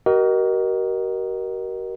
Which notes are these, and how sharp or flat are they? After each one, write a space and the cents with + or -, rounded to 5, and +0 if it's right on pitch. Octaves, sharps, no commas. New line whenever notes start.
F#4 +45 A#4 +15 D#5 +0